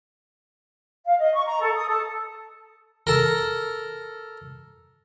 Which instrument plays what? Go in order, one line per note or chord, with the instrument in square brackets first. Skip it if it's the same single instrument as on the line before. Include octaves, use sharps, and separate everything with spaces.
[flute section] F5
D#5
C#6
A#5
A4
D#6
A4
[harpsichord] A4 A#4